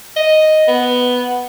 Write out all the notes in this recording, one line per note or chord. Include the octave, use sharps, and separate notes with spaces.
D#5
B3